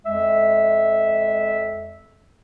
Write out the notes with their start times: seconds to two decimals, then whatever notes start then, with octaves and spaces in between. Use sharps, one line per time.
0.05 F2 G#3 E5